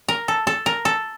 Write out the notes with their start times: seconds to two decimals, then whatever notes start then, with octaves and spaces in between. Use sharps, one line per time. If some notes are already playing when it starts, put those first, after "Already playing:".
0.08 A#4
0.28 A4
0.47 A4
0.66 A#4
0.85 A4